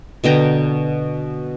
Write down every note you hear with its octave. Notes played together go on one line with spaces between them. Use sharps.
B2 D3 G5 A#5